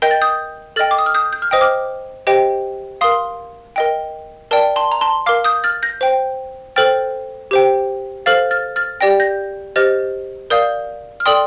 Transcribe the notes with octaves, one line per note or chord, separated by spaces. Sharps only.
A#4 D#5 G5 G6
A6
D#6 G6
A4 D#5 G5 F6 A6
D6
D#6
F6
D#6 G6
G6
F6
C5 D#5 G5 D#6
D6 F6
G4 C5 D#5 G5
A#4 F5 C6 D#6
A#4 D#5 G5
A#4 D5 G5 A5
A5 C6
A#5
A5 C6
A#4 F5 D6 F6
D#6 G6
F6 A6
G6 A#6
C5 G5
A4 C5 G5 F6 A6
G4 C5 G5
A4 C5 F5 F6 A6
F6 A6
F6 A6
G4 D5 G5 A#6
G6 A#6
G4 C5 D#5 F6 A6
A#4 D5 F5 D#6 G6
F6
A4 D5 G5 C6 D#6